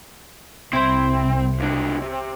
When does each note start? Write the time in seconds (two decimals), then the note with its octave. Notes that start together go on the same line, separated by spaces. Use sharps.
0.73 C2 C4 E4 C5
1.60 C#2 D4
2.02 C3